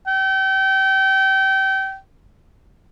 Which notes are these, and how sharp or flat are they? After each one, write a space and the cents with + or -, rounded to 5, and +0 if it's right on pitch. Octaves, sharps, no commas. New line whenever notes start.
G5 -30